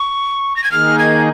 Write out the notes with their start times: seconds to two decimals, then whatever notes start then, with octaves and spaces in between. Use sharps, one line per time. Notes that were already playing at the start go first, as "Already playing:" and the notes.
Already playing: C#6
0.56 A#6
0.64 G#6
0.72 D#3 A#3 D#4 G#4 F6
0.99 G#6